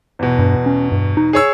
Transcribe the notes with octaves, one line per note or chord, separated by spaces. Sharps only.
E2 B2
G2
C#4
G2
D#4
G#4 C#5 E6